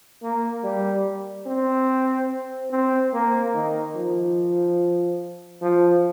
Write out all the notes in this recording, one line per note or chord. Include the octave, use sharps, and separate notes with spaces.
A#3
G3
C4
C4
A#3
D#3
F3
F3